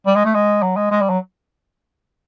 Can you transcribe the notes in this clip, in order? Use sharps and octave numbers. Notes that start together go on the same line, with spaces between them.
G3
G#3
A3
G#3
F#3
G#3
G#3
G3
F#3